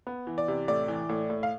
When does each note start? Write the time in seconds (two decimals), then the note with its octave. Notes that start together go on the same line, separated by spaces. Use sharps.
0.07 B3
0.27 E3
0.38 D5
0.48 C3
0.68 A2 D5
0.88 E3
1.09 A2
1.30 A2
1.43 F5